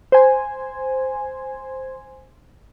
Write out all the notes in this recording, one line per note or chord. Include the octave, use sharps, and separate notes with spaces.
C5 G#5